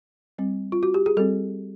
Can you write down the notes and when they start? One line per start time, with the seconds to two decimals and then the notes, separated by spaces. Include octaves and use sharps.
0.38 G3 C4
0.72 F4
0.83 F#4
0.94 G4
1.06 G#4
1.17 G3 C4 A4